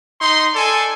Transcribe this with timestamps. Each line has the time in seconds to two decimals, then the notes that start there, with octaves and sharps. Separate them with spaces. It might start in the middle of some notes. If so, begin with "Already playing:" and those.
0.21 D#4 C6
0.55 A4 D5 G#5